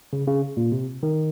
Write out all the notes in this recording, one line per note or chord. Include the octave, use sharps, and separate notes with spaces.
C#3
C#3
A#2
C3
D#3